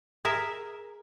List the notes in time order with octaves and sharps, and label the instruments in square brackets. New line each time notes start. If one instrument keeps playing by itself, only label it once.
[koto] G#4 A#4 E5